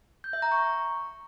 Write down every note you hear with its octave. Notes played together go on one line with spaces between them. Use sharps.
G6
E5
A#5
C#6